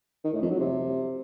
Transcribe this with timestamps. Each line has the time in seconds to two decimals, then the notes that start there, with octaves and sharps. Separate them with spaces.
0.24 D#3
0.33 A2
0.42 F2
0.51 F#3
0.59 C3